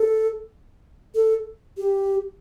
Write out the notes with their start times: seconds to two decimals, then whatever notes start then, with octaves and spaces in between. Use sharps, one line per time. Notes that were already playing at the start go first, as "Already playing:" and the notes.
Already playing: A4
1.15 A4
1.77 G4